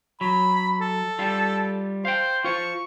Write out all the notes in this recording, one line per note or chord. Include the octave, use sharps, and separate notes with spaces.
F#3 B5
A4
G3 F4
C5 F5 G5
F4 C5 C#6